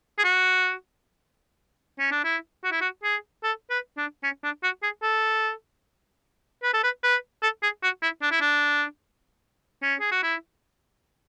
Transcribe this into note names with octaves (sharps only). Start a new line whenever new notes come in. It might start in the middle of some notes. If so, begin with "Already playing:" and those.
G#4
F#4
C#4
D4
E4
F#4
E4
F#4
G#4
A4
B4
D4
C#4
D4
F#4
G#4
A4
B4
A4
B4
B4
A4
G#4
F#4
E4
D4
E4
D4
C#4
G#4
F#4
E4